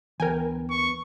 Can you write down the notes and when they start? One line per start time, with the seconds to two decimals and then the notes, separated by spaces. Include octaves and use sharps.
0.20 D2 E3 B3 A#4 G5 G#5
0.70 C#6